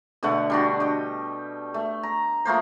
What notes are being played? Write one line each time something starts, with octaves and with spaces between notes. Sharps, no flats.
B2 D3 A3 F#5
G3 D4 F#4
D#5 G5
A3
A#5
F3 A3 A#3 C5